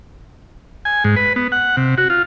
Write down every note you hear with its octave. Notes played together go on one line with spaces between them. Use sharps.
G#5
G#2
B4
B3
F#5
C3
F#4
F4